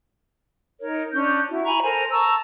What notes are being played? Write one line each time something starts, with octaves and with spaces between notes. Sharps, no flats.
D#4 A#4 C#5
C#4 D4 G6
E4 F#4
G#5 A#5 B5 C#6
A4 A#4 C5 G#5
A5 A#5 C#6 E6